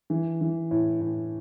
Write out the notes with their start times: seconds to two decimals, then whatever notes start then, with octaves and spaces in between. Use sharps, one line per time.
0.10 E3
0.41 E3
0.71 A2
1.01 A2